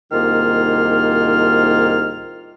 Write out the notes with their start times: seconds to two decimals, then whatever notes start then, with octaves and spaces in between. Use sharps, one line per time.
0.12 C2 G#2 D#3 A#3 F4 F6